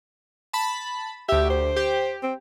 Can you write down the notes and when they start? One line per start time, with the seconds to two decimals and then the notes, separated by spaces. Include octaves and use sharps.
0.53 A5 B5
1.29 D2 G4 E5
1.50 C5
1.76 G4
2.23 C4